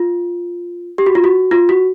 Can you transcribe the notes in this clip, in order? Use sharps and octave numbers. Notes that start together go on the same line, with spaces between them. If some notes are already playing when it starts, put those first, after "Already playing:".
Already playing: F4
G4
F#4
F4
F#4
F4
F#4